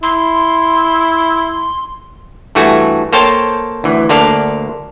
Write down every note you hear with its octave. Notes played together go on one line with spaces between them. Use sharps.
E4 C6
G2 E3 A3 F#4 A4 G#5
A#3 A4 C5 C#5 G5 A5
D2 E3
D2 A#3 D4 A4 D5 F5